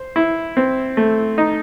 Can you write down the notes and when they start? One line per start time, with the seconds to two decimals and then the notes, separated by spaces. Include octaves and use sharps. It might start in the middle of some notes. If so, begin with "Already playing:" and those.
Already playing: C5
0.16 E4
0.57 C4
0.97 A3
1.38 D#4